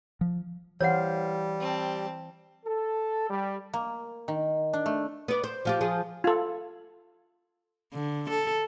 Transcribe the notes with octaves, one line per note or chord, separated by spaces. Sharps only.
F3
E3 G3 C5 C#5 F5 F#5
C4 A5
A4
G3
A#3
D#3
D4
A3
B3 D5
C5
F3 F4 G4
F3 G#4
F4 A4
D3
A4